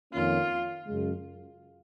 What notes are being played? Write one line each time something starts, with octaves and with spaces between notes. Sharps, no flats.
F2 D#3 A#3 C#4 F4
F#2 C#3 G#3